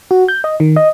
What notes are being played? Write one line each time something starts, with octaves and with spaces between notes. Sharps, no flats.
F#4
G6
D#5
D#3
D#5